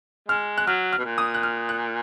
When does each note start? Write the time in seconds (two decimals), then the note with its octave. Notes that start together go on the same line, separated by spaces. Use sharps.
0.28 G#3 F6
0.58 F#6
0.66 F#3 F6
0.93 F6
0.98 B2
1.05 A#2
1.18 D#6
1.34 F#6
1.43 F6
1.69 F#6